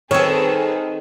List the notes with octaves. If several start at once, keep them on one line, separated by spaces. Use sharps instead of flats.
D#3 C4 G#4 A4 B4 C#5